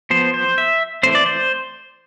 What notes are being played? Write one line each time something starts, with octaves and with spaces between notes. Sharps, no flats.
F3 B3 C5
C5
E5
E3 A3 C4 C5
D5
C5